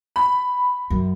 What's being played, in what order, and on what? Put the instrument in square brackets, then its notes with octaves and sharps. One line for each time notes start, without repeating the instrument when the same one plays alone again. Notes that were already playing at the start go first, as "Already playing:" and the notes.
[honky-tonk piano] B5
[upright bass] F#2